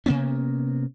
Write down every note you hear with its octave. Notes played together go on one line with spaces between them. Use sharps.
C3 A#3 B3 C#4